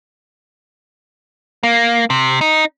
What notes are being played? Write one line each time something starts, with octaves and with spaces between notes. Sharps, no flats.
A#3
C3
D#4